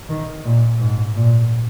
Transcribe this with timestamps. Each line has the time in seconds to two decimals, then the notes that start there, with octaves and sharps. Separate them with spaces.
0.09 D#3
0.45 A#2
0.80 G#2
1.16 A#2